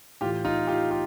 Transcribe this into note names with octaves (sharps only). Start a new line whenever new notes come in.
A2 E3 F4 G4
D#4 F4
F4 G4
F4 G4